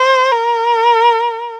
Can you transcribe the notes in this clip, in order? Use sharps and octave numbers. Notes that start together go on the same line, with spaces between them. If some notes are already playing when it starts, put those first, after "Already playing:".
Already playing: C5
A#4